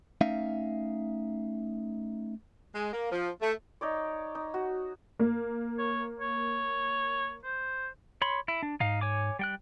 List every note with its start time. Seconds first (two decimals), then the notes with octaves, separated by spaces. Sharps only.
0.21 A3 C#4 D#4 E5 F5
2.75 G#3
2.93 A#3
3.12 F3
3.41 A3
3.81 D#4 C#5 D5
4.35 D#4
4.54 F#4
5.19 A#3
5.79 C#5
6.20 C#5
7.44 C5
8.22 C#5 B5 C6
8.48 E4
8.63 D4
8.80 G#2 D#4 F5
9.01 C#5 G#5 D6
9.39 G3 G5 F#6